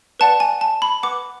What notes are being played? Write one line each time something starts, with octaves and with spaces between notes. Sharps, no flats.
B4 D5 F#5 A5
G#5
A5
B5
B4 F#5 D6